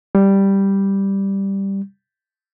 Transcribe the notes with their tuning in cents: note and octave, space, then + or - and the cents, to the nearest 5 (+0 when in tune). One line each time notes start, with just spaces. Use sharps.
G3 +0